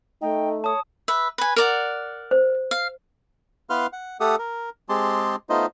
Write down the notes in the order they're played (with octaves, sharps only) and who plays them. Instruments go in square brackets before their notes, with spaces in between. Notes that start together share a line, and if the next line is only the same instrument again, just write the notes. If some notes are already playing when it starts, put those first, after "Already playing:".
[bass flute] A3 [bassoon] D#4 [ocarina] G5
[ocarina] C#5 [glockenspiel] A5 D#6
[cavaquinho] B4 E5
B4 G#5
A#4 D5 F#5
[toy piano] C5
[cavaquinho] F5
[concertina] B3 E4 B4 F5 C6 F6
F#5
A3 G4 A4 F#5 D#6
A#4
G#3 C4 G4 G#4 A5 C6
A3 B3 D#4 F4 C5 D#5